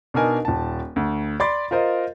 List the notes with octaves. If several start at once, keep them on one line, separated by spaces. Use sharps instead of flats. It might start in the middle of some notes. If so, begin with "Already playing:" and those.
B2 D4 D#4 A#4 G#5
D#1 A5
D2
D5 B5 C6 D6 A6
F4 A#4 C5 D#5